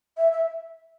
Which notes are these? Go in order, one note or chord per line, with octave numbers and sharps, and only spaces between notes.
E5
E5